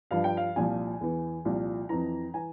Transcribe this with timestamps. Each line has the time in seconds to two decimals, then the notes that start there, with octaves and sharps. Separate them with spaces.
0.11 G2 F3 F5
0.24 G5
0.37 F5
0.56 C2 A#2 F3 G#5
1.01 E2 E3
1.45 C2 A#2 F3
1.89 F2 E3 A#5
2.34 E3 G#5